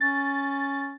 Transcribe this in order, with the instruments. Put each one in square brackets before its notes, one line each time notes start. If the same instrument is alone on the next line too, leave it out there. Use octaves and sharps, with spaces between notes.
[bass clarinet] C#4 [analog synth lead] A6